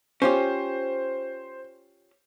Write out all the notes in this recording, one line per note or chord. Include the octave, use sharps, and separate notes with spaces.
C#4 F4 G4 C5